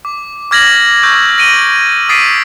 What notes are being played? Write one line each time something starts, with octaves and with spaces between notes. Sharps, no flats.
D6
D6 F6 G#6 A#6 B6 F#7
C#6 E6 G6
A#6 D7 D#7 F#7 G7
D#6 A6 B6 C7 D7 D#7